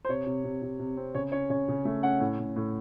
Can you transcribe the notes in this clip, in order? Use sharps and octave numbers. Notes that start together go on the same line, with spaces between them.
C5
C3 C#5
C3
C3
C3
C3
C4
C#3 C#5
C#4 C#5
C#3 C#5
C#3
A3
C#4 F#5
A2
A2
A2